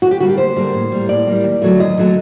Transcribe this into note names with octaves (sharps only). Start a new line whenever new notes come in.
D2 F#4
G4
D3 G3 A#3 F#4
G4
D2 C5
D3 G3 A#3
A2
G3 A#3
A2 D5
G3 A#3
D#2
D3 F#3 A3
D#2 D#5
D3 F#3 A3